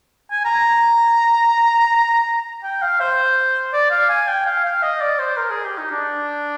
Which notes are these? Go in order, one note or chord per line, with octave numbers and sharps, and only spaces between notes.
G#5
A#5
G5
F5
C5
D5
F5
G#5
G5
F5
F5
D#5
D5
C5
A#4
G#4
G4
D#4
D4